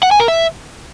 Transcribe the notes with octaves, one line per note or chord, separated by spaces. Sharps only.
F#5
G#5
A#4
E5